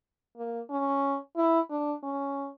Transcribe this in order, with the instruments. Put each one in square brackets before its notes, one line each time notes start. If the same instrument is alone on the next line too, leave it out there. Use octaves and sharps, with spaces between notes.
[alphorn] A#3
C#4
E4
D4
C#4